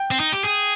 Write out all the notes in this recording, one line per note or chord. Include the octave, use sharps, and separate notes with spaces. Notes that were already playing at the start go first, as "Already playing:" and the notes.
Already playing: G5
C4
D#4
G4
G#4